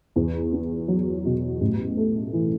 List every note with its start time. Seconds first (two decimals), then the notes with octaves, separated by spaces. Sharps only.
0.16 E2
0.53 B3
0.88 F#3
1.25 B2
1.61 A1
1.97 A3
2.33 E3